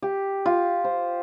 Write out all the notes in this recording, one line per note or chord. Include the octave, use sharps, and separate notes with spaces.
G4
F4
C5